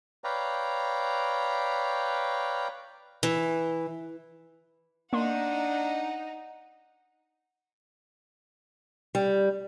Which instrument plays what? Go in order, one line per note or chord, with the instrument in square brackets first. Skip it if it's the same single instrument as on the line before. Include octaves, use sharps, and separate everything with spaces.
[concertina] B4 C#5 D5 F5 G5 A#5
[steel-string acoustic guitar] E3
[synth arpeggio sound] A#3 C6 [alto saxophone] D4 [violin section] D#4 [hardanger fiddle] F#5
[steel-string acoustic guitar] G3